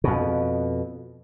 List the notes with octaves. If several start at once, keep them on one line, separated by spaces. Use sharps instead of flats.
F2 B2